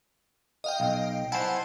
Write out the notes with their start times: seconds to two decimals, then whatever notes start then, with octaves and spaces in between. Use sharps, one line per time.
0.64 D#5 F5 G5
0.80 B1
1.32 E4 C5 F#5 G#5 A5